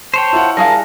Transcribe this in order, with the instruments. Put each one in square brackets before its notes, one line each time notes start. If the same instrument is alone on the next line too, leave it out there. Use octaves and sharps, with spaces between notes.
[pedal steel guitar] C5 C#5 G5 [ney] A5
[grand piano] E4 F4 F#5
[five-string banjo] G3 G#4 F5 [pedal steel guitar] A#4 [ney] A5